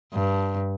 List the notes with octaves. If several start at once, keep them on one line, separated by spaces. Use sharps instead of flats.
G2